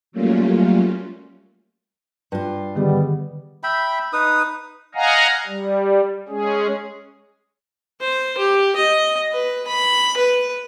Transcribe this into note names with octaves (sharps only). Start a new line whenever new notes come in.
F#3 G3 A3 A#3 C#4 F4
G2 F4
D3 D#3 G3 B3 G#4
E5 G5 B5
D#4 B4 D#6
D#5 F5 F#5 G#5 A#5
G3
G#3 C#4 G#4
C5
G4
D#5
B4
B5
B4